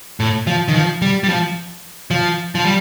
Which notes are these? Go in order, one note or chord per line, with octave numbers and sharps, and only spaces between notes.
A2
F3
D#3
F3
G3
G3
F3
F3
F3
G3